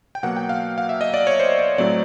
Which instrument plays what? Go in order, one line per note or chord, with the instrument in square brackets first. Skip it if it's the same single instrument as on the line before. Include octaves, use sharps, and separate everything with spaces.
[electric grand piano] G5
B2 F#3 A#3 F#5
G5
F5
F5
E5
D#5
D5
C#5
C5
D5
A2 F#3 A3 C4 D5